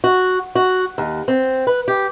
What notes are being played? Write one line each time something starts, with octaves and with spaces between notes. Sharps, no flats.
F#4
F#4
D#2
C4
B4
G4